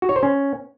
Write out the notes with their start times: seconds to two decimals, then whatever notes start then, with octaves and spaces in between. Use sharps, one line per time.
0.02 F#4
0.09 C#5
0.16 C5
0.23 C#4